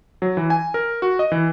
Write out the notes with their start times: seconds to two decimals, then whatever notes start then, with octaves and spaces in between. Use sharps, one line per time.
0.22 F#3
0.37 E3
0.50 G#5
0.74 A#4
1.02 F#4
1.19 D#5
1.32 E3